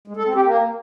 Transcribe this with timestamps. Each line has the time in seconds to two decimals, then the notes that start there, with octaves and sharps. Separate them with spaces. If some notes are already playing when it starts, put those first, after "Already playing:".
0.08 G#3
0.17 A4
0.26 C4
0.35 G4
0.44 A#3